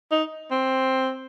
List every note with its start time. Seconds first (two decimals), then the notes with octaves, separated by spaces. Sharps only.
0.11 D#4
0.51 C4